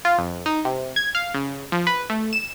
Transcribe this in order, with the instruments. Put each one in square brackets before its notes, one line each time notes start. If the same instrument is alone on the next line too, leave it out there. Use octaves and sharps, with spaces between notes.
[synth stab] F4
F2
D#4
C3
G#6
F5
C#3
F3
B4
A3
E7